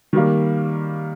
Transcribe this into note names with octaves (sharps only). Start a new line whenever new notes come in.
D#3 G3 A#3